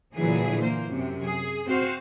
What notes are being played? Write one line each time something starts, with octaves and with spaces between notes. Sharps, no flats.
A#2 D3 E3 F#3 G#4
A#3 C5
F#2 C3
G#4
C4 F#4 C5 F5